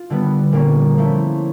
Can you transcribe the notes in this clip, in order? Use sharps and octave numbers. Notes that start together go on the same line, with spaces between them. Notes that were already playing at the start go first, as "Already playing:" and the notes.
Already playing: F4
D3 G3 B3
A#2 G3 A#3 C#4
F3 A3 C#4 E4